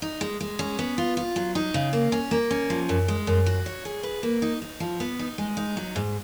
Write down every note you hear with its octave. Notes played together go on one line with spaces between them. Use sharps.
D#4
G#3
G#3
C#4
B3
F4
F4
F#3
D#4
C#3
A#3
C#4
A#3
C#4
F3
F#2
G#3
F#2
F#4
C#5
G#4
B4
A#3
D#4
D#4
F3
B3
D#4
G#3
D#4
F#3
G#2